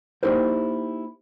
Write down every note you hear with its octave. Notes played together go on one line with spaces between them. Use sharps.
A#3 D#4 E4 G4 A#4 C5